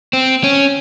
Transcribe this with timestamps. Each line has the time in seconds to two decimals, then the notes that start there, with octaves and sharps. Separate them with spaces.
0.13 C4
0.44 C#4